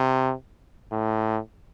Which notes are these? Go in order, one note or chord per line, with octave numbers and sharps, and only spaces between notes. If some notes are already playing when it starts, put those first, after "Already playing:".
Already playing: C3
A2